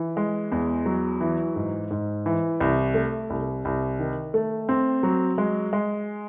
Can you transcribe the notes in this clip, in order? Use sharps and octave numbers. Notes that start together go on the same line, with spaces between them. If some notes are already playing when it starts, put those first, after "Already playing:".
Already playing: E3
G#3
E2
F#3
E3
G#2
G#2
E3
C2
A3
C2
C2
D#3
A3
C4
F#3
G#3
G#3